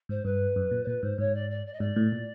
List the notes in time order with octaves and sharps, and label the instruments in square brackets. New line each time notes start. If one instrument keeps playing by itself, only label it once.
[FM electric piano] G#2 [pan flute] C5
[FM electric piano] G2 [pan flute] B4
[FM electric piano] F#2
A#2
[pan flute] C5
[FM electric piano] A#2 [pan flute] B4
[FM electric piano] G#2 [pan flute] C5
[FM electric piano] G#2 [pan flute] C#5
[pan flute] D5
D5
D5
D#5
[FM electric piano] G#2 [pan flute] D5
[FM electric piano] A2
A#2